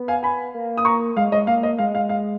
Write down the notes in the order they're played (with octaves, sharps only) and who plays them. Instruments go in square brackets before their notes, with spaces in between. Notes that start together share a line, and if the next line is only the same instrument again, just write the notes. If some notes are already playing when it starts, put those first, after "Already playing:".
Already playing: [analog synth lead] B3
[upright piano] F5 G#5
G#5 B5
[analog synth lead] A#3
[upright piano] D#6
A#5 C#6
[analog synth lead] G#3 [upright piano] F5
[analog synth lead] G#3 [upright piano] D#5
[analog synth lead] A#3 [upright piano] F5
[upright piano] D#5
[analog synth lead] G#3 [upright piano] F5
[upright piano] F5
F5